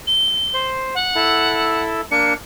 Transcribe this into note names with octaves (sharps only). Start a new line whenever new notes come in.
G7
C5
F#5
E4 A4
A#3 D4 C#7